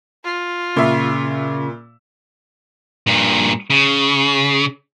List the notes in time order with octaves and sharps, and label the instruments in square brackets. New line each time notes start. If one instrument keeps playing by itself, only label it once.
[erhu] F4
[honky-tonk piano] A#2 E5 [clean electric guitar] C#3
[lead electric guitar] G2 A#2
C#3